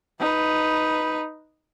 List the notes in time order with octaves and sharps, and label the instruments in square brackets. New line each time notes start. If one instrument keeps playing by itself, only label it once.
[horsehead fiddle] D#4 B4